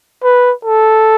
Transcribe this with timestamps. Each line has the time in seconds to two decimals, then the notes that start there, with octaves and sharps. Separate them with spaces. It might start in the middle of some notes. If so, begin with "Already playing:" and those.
0.23 B4
0.65 A4